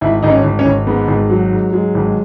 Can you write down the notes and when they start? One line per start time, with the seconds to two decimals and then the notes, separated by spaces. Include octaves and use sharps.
0.01 G#1 E4
0.23 G#1 D#4
0.30 C#4
0.44 G#1
0.59 C#4
0.65 G#1
0.87 G#2 B3
1.08 G#1
1.30 F#3
1.52 G#2
1.72 F#3 G#3
1.95 G#1